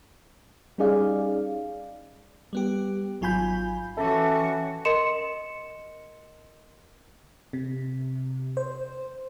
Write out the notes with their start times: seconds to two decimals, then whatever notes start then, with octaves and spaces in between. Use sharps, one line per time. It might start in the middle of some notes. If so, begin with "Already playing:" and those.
0.78 G3 C#4 D#4 G#4 D5 F5
2.53 G3 B3 G4
3.21 G#1 F#3 F4 G#5 B5 G6
3.97 E3 C#4 F#4 A4 E5 G5 D6
4.85 A#4 D#5 C6 C#7 E7
7.53 C3
8.57 C5